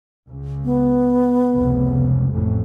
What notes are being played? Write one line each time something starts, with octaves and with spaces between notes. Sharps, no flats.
C#2
B3
F1 C#2 C#3
A1 F2 A2